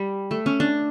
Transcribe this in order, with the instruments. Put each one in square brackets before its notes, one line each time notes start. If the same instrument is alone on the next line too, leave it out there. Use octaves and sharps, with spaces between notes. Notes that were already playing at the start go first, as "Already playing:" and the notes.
Already playing: [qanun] G3
A3
C#4
D4